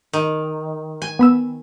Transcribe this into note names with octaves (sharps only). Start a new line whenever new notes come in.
D#3
G#5
B3 B5 E6